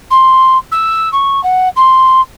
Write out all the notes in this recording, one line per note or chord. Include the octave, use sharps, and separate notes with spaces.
C6
E6
C#6
F#5
C6